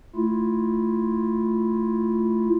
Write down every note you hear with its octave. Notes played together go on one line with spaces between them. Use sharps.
A3 E4 F4